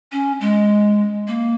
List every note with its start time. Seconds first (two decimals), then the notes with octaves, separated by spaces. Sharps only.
0.12 C#4
0.41 G#3
1.28 A#3